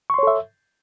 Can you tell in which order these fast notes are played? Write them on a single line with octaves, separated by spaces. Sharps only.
C#6 C6 C#5 A4 E5